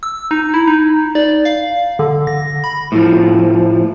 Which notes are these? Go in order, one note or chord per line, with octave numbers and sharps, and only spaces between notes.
E6
D#4
E4
D#4
D5
F5
D3
A#6
B5
A2 F3